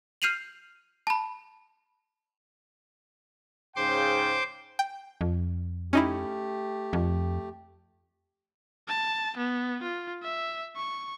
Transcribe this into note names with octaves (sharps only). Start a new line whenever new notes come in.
F6 G6 C7 D#7 F7 F#7
A5 B5
G#2 C#3 C5 G5 C6 D6
G5
F2
A3 C#4 D#4 E4 G4
F2
A5
B3
F4
E5
C#6